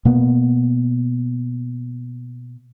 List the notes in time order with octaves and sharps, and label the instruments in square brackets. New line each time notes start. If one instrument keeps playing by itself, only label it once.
[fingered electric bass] B2 A#3 B3